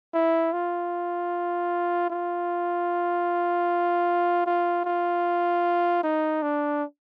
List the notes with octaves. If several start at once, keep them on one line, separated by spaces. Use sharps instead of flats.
E4
F4
F4
F4
F4
D#4
D4